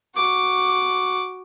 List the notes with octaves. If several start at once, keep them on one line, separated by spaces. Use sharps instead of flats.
F#4 D6